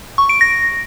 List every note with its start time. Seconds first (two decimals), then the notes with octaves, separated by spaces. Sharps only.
0.18 C#6
0.29 D7
0.41 A#6